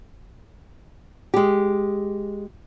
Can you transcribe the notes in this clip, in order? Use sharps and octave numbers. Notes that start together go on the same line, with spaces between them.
G#3 G4